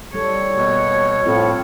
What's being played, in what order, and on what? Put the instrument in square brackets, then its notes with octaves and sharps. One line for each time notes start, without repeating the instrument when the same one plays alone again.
[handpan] G3 A4 [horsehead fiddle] C#5
[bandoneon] B2 [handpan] A#3
[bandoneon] A2 [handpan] C4 F4 A4